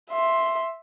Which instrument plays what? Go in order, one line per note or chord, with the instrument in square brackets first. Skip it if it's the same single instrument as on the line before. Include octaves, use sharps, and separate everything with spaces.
[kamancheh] E5 C6